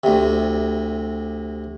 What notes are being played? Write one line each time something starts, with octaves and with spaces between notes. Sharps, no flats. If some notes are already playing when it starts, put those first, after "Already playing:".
D2 C3